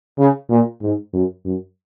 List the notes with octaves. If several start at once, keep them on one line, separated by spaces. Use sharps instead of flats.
C#3
A#2
G#2
F#2
F#2